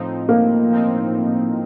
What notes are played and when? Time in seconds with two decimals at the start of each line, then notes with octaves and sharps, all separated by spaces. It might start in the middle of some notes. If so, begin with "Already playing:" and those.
Already playing: A2 F3 C4 D#4
0.29 A2 A#3
0.70 F3 C4 D#4
1.12 A2